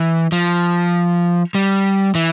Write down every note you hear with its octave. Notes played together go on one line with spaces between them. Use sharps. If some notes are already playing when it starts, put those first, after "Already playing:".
Already playing: E3
F3
G3
E3